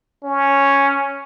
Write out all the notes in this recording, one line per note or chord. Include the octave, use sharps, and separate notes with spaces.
C#4